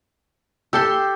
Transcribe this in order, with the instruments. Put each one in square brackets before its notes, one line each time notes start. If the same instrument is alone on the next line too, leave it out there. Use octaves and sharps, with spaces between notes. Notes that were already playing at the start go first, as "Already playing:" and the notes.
[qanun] G4 C6 [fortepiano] A4 E6